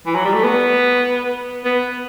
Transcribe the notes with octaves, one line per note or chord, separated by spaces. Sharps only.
E3
F#3
G3
A3
B3
B3